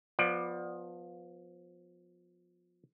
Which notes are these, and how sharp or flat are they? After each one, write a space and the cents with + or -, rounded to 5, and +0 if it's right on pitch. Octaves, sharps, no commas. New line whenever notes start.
F3 +20 B3 +0 D5 +20